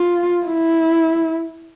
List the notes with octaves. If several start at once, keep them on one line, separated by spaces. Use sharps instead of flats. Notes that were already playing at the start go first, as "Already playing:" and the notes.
Already playing: F4
E4